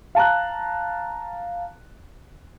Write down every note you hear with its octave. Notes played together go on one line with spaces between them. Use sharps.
F5 A5 A#5 F#6